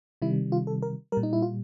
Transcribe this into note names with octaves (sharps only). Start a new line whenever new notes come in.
C3 D#3 G3 E4
F4
A4
A#4
A#2 G3 A#4
D#4
E4
F4